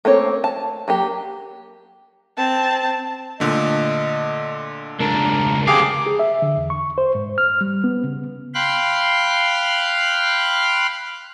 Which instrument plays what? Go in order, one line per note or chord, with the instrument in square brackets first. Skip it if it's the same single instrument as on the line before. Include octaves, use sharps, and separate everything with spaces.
[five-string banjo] A3 A#3 C4 C#5
A5
F#3 A#3 G4
[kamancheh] C4 A5
[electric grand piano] A#2 D3 A3 [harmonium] D#5
[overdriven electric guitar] C#2 D4 [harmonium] A#4 A5
[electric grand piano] D2 [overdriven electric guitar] C4 F5 [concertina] G4 G#4 D6
[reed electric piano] G#4
E5
D3
E2
C#6
C5
G#2
F6
G3
B3
C#3
[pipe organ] F5 G5 B5 C6 F6 F#6